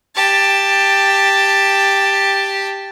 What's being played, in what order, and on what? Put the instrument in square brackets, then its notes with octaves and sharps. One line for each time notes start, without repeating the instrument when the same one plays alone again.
[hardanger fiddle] G4 A5